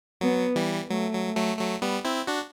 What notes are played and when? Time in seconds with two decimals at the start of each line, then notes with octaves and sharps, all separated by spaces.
0.21 F#3 B3
0.56 E3 G3
0.90 F#3 A3
1.13 F#3
1.36 F#3 A3
1.59 F#3 A3
1.82 G3 B3
2.04 C4 E4
2.27 D4 F#4